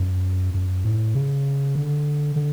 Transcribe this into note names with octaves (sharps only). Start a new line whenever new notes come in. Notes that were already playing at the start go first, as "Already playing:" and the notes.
Already playing: F#2
F#2
A2
C#3
D3
D3